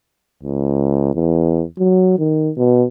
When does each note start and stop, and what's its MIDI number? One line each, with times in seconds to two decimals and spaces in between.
0.43 1.15 37
1.15 1.64 40
1.79 2.14 54
2.18 2.51 51
2.57 2.85 47